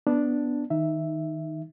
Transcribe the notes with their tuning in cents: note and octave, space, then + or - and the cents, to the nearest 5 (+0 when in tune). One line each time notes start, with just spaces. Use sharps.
B3 +0 D4 +0
D#3 +15 D#4 +0 E5 +0